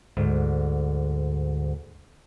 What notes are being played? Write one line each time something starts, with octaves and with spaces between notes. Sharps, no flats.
D2 G#2